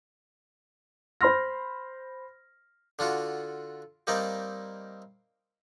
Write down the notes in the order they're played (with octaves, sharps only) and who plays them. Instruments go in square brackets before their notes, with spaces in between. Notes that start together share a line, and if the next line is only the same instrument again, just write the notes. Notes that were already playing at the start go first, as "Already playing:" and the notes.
[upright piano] C5 B5 C6 F6 A#6
[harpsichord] D3 D4 F4 F#4
G3 A#3 C4 D#4 D5 D#5